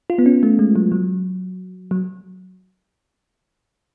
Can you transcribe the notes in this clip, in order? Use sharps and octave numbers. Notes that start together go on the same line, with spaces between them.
F4
B3
C#4
A3
G#3
F#3
F#3
F#3